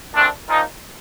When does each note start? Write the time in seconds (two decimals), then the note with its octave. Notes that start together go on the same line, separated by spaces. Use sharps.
0.15 A#2 A3 C4 D4
0.49 A#2 F3 A#3 D#4